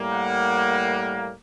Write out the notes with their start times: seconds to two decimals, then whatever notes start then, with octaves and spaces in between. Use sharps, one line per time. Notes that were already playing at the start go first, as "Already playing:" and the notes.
Already playing: A2 G3 A#3
0.12 F#5